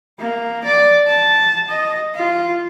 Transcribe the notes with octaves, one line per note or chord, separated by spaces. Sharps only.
A#3
D5
A5
D#5
F4